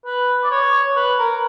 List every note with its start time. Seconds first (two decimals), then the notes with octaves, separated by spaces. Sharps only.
0.05 B4
0.44 D5
0.51 C#5
0.96 B4
1.19 A#4